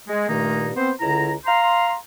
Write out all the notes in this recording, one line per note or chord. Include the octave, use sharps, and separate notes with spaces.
G#3
G2 A#2 D#3 A3 A#3 D#4
B3 C4 C5
C#2 D3 E4 A#5
F5 A#5 C6